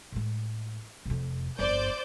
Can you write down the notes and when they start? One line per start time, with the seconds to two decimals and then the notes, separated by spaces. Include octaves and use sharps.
0.12 A2 G#3
1.06 F1 F2
1.59 G1 F2 C5 D5 G6